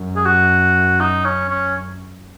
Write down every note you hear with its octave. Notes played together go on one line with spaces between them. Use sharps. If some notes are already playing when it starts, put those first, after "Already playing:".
Already playing: F#2
G#4
F#4
D#4
C#4
C#4